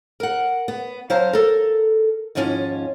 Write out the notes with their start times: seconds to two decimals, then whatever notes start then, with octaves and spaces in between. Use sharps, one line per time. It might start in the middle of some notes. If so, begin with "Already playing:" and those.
0.20 A#4 F#5
0.68 B3
1.10 F#3 C#4 C5 F5 A5 A#5
1.33 A4 A#4
2.35 D#2 G#2 F3 C#4 F4